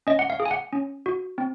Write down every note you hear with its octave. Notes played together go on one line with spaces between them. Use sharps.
C#4 D#5
F#5
F5
G#4
G#5
F#5
C#4
F#4
C4